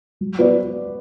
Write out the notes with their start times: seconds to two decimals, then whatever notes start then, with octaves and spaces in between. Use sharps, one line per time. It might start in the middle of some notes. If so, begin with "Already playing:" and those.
0.21 F#3
0.39 B3 F#4 B4 D5